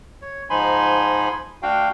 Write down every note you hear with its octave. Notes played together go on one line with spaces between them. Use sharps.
C#5
G#2 F3 D#4 G#5 B5 C6
D2 D4 F#4 F5 G5